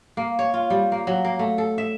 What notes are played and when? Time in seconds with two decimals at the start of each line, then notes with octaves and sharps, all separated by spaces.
0.17 A#3
0.39 C#5
0.54 F4
0.70 G3
0.92 A#3
1.07 F#3
1.24 A#3
1.39 A3
1.58 A4
1.78 E5